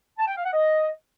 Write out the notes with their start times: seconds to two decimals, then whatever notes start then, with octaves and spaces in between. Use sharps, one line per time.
0.18 A5
0.26 G5
0.35 F5
0.44 F#5
0.53 D#5